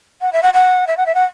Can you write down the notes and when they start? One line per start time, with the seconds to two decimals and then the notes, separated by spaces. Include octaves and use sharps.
0.21 F#5
0.32 E5
0.42 F#5
0.53 F#5
0.87 E5
0.97 F#5
1.06 E5
1.14 F#5